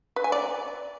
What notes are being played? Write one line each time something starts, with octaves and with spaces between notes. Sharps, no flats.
B4
G#5
D5